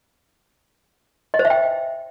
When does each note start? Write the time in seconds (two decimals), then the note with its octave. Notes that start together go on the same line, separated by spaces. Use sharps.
1.34 D#5
1.39 C5
1.45 E5
1.50 G5